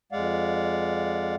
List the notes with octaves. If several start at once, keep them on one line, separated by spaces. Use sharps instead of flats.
F2 G#3 D5 F5 F#5